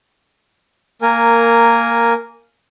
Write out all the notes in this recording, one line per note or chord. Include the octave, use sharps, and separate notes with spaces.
A#3 A#4 G#5